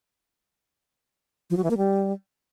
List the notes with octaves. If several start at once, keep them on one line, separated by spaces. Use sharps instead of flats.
F3
F#3
E3
A#3
G3